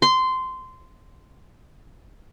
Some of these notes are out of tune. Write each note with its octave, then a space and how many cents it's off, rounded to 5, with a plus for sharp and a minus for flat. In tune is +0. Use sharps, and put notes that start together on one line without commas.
C6 -15